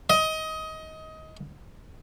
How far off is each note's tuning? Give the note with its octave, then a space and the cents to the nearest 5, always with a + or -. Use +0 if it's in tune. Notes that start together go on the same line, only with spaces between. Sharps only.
D#5 +20